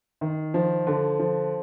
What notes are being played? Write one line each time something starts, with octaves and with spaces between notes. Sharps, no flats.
D#3
F3
D3
F3